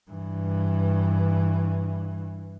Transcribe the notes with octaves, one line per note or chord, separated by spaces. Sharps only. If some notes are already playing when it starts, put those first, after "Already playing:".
G2 E3